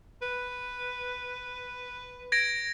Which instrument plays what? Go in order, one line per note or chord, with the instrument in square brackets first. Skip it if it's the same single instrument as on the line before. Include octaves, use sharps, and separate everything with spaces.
[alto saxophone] B4
[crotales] G#6 A#6 D7